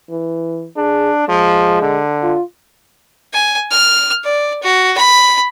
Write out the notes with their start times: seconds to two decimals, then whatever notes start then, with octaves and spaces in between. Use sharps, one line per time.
0.10 E3
0.77 D4 G#4
1.29 F3 G#3
1.82 D3
2.23 F4
3.34 G#5
3.71 F6
4.24 D5
4.63 F#4
4.98 B5